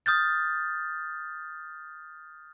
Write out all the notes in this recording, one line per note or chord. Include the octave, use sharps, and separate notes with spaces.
D#6 F6 G6 A6